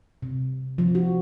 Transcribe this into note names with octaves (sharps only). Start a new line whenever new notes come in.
C3
F3
F#4